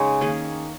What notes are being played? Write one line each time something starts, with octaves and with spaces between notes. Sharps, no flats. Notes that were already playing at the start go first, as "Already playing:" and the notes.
Already playing: C#3 G#3 D#4 C#5 C#6
D#3 A#3 C#4 G#4